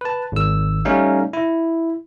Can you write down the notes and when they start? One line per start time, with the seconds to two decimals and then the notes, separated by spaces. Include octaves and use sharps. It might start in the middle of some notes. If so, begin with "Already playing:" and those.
0.01 B4 A5
0.32 G#1 E6
0.85 G3 A3 C#4 D#4 F5
1.33 E4